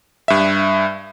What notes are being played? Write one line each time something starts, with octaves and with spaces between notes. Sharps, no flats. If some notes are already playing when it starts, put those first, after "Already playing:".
G2 E5